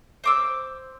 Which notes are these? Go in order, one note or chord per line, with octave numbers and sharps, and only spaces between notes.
C5 D6 E6